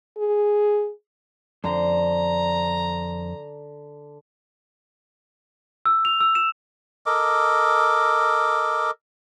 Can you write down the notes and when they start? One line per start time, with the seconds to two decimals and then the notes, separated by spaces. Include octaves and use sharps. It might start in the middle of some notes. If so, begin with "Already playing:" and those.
0.17 G#4
1.64 F2 D3 C5 A#5
5.86 E6
6.05 F7
6.20 E6
6.35 E7
7.06 A4 A#4 D#5 D6